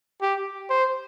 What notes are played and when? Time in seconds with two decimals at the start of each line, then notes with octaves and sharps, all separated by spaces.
0.22 G4
0.70 C5